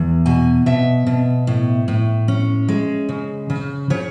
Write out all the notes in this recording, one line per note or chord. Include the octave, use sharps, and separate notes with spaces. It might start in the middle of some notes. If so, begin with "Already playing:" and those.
Already playing: E2
B2 G#5
B2 E5
B2
A2
A2
C#4
G#3
C#3
C#3
C#3 C#5